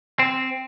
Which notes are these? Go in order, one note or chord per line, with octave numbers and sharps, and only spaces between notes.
C4